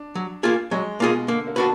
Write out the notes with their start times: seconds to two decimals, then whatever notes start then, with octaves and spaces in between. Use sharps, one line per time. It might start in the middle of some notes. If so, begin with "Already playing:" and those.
Already playing: D4
0.15 F#3
0.43 A#3 F4 G#4
0.71 F#3 G#3
1.00 B2 A#3 F4 G#4
1.28 D3 A#3
1.47 A#3
1.56 B3 D4 F#4 B4